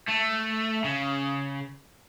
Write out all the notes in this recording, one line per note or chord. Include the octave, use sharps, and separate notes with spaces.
A3
C#3